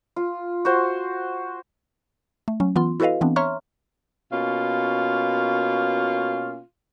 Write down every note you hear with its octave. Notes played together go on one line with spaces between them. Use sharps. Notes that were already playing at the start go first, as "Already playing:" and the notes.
F4
F#4 C5
A3
F#3 C#4
E3 B3 F4 C6
E4 F#4 A4 B4 D#5 F5
E3 B3 C4 D4
C#5 E5 A#5 C6 C#6 F6
B2 A#3 C#4 F4